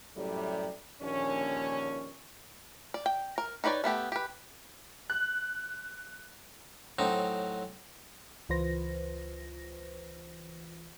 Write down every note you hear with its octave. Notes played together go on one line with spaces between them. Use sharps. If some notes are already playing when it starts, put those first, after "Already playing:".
F#2 A2 C3 G3
A#1 D#2 D3 C#4
D5
G5
A#4
D#4 G4 B4 C#5 D5
A3 B3 G4 A4
G4 B4
F#6
A2 F#3 C4 D#4
C#2 E3 F4 B4 C5 A#6